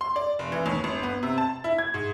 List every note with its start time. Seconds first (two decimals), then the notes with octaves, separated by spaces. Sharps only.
0.01 C6
0.16 D5
0.39 F1
0.52 E3
0.66 D#2
0.84 G1
1.03 B3
1.23 C3
1.38 A5
1.64 E4
1.78 G#6
1.94 G#2